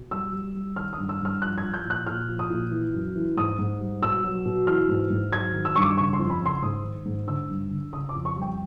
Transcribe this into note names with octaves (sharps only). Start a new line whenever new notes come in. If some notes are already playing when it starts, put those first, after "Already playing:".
Already playing: B2
G3 E6
G3
G3
D#3 F6
D#6
G2
E6
G2 F6
F3 F#6
G#6
F3
G6
A#2
F#6
A#2 F6
F3
D#6
A#2
E3
F#2
E3
G#2 D#6
G#2
G3
B2 E6
F#3
B2
E3 F6
G#2
G#2
F#3 G#6
D#3
E6
G2 C#6
D6
C#3 C#6
C6
F2
B5
C#3
C6
G#2 D#6
D#3
G#2
D3 E6
G2
D3
C#3 D#6
D6
F2
C#6
G3 G5